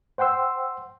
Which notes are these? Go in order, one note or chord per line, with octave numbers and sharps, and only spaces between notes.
C5 F#5 G5 C6 E6